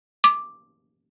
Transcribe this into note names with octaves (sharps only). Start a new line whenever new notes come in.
D6